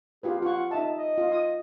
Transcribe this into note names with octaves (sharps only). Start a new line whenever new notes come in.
F4 G4 G#4 B4
F4 F#5 C#6
D#4 D#5 E5 A5
D#5
F4
D#6